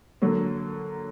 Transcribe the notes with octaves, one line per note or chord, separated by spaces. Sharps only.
D3 F#3 A#3